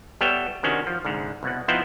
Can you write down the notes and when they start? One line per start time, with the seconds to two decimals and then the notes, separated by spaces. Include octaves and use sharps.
0.21 G3 B3 A4 C#5 E5 G5
0.63 C3 D#3 C#4 D4 F#4
0.87 F3
1.05 C2 G#2 D3
1.43 C2 B2 F#5
1.68 F3 B3 C4 D#4 E4 C5